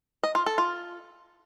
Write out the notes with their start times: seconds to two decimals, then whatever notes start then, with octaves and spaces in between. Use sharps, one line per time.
0.23 D#5
0.35 F4
0.46 A4
0.58 F4